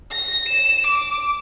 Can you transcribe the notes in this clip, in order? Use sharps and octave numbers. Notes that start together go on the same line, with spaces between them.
A#6
E7
D6